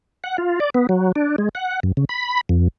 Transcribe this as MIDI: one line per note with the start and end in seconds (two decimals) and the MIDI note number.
0.24 0.37 78
0.38 0.59 65
0.60 0.70 74
0.74 0.87 59
0.89 1.12 54
1.16 1.36 62
1.38 1.49 56
1.55 1.80 78
1.83 1.92 42
1.97 2.05 49
2.09 2.41 83
2.49 2.68 41